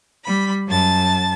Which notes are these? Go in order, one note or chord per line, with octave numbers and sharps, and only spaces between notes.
G3 B5
F#2 A5 A6